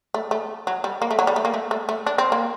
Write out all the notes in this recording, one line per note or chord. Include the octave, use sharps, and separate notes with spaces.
A3
A3
F#3
G3
A#3
A3
F#3
G3
A3
A#3
A3
A3
A3
D4
C4
A#3